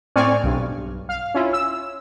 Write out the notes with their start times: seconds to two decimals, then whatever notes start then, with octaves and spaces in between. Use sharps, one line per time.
0.16 A2 C4 D5 G#5 C#6 F6
0.44 B1 G2
1.09 F5
1.34 C#4 E4 F4
1.53 E6